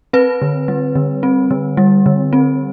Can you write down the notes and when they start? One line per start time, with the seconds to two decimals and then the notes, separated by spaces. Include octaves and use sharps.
0.13 C4 B4
0.42 D3
0.68 G3
0.96 D3
1.23 C4
1.51 D3
1.77 G3
2.06 D3
2.33 C4